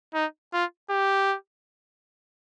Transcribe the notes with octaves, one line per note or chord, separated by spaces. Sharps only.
D#4
F4
G4